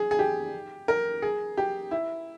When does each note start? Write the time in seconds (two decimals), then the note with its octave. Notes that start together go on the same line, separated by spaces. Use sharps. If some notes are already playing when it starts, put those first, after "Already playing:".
Already playing: G#4
0.11 G#4
0.19 G4
0.88 A#4
1.22 G#4
1.57 G4
1.91 E4